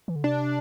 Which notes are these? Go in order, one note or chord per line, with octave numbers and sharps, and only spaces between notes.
E3
D3
C3 D4